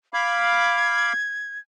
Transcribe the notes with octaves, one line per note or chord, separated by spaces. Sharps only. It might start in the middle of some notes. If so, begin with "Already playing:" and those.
F5 B5 D6 G#6